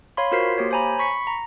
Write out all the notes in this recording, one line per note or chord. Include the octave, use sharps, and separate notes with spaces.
C#5 F5 B5 C6
F4 F#4 A#4 C5 B6 C7
A#3 G4 C#5
C5 C#5 G#5 A#5 B5
B5 C#6 B6 C#7
A#5